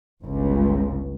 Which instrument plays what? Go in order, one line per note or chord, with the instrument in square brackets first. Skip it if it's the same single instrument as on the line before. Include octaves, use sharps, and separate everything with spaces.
[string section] G1 C#2